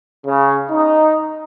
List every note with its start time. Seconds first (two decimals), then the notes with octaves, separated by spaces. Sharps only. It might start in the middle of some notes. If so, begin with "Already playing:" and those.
0.26 C#3
0.70 D#4